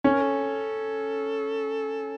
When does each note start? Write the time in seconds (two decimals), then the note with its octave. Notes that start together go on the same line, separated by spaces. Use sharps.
0.04 C#4 A4
0.13 A#4
0.21 A4